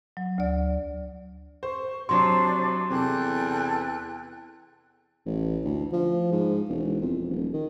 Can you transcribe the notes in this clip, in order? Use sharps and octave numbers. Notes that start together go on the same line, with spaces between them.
F#3
D2 D5
C5 C#6
C3 F#3 D4 C5 C6 C#6
E2 C3 A4 G5 F#6
A1
D2
F3
G#2
E1
F2
D#1
D#3